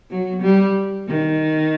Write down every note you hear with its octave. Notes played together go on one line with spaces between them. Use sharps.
F#3
G3
D#3